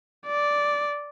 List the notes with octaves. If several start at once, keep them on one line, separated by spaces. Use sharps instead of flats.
D5